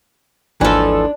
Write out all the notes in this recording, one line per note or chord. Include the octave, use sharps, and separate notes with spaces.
G#1 D#2 E3 F3 D4 A4